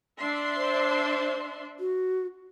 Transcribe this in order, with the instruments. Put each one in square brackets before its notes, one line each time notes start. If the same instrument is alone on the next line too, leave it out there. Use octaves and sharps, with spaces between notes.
[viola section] D4 E5 C6
[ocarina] C5
F#4